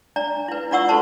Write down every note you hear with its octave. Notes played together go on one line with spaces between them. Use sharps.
D4 D5 A#5
E4 B4
D4 F4 D5 F#5 C#6 E6
F#4 A4 B4 C5 A5 C#6